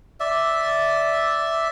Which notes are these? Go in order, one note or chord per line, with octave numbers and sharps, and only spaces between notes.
D5 E5